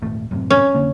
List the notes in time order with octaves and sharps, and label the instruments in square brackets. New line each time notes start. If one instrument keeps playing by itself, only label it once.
[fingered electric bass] D#1 G#1 A3
F#2 A2 C3
[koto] C#4
[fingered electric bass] F1 D3 A#3